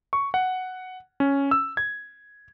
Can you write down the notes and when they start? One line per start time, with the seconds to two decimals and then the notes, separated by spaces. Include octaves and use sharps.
0.13 C#6
0.34 F#5
1.20 C#4
1.51 E6
1.77 G#6